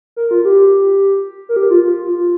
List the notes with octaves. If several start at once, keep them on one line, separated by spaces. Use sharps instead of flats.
A#4
F4
G4
A#4
G4
F4
F4
F4